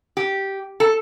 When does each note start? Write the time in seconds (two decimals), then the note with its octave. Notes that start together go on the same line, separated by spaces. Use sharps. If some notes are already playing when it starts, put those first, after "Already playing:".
0.17 G4
0.80 A4